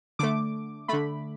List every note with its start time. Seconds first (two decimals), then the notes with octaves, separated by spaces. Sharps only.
0.19 D3 A3 D6
0.88 D3 A3 B5